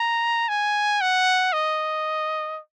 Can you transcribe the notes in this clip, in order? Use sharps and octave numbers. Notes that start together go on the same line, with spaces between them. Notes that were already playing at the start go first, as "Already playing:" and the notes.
Already playing: A#5
G#5
F#5
D#5